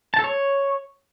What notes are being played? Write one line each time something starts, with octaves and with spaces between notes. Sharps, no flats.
A5
A4
C#5